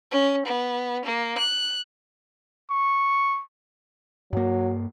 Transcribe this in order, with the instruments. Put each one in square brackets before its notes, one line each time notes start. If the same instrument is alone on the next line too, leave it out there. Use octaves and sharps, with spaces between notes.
[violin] C#4
B3
A#3
F#6
[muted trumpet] C#6
[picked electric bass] G2 A#3 [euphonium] F#3